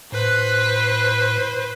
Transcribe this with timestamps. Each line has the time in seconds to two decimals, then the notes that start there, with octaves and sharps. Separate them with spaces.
0.12 A2 B4 C5 F#6